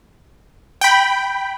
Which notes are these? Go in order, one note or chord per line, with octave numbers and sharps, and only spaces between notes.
G5 B5